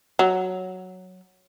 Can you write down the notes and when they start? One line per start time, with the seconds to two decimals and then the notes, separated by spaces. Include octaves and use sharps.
0.19 F#3